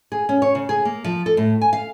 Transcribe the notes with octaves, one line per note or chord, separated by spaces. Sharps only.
G#4
C#4
C#5
C#3
G#4
A#3
F3
A4
A2
G#5
F5